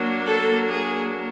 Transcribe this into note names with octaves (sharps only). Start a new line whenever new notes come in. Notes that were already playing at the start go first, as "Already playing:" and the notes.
Already playing: F#3 A#3 D4
A4
G#4